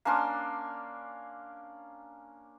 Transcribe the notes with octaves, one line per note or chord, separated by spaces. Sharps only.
A#3 C#4 D4 C6